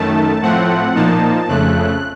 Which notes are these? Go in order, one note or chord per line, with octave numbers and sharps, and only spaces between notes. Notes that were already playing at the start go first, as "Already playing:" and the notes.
Already playing: F#2 D#3 A3 A5
A2 F3 A3 C4 F#5
A#2 F3 A#3 D#4 A5
F2 C#3 A3 F#6